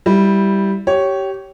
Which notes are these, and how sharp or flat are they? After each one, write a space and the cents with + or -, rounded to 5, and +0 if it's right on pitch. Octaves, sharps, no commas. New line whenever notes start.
G3 +0 E4 +0
G4 -20 C#5 +0